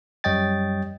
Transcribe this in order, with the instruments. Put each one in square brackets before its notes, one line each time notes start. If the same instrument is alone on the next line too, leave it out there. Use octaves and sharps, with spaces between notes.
[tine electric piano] F#2 G3 C#5 D#5 G5 A6